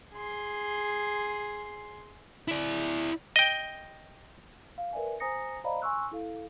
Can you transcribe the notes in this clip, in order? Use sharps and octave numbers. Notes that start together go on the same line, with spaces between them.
G#4 C6
E4 D5
D#5 G5
F5
A#4 B4 D5 E5 G#5
C5 G#5 A#5 D#6 A#6 C#7
C5 D5 D#5 F5 A#5 B5
G#5 C6 C#6 E6 F#6
E4 A4 F5